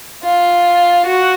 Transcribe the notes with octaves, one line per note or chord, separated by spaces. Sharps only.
F4
F#4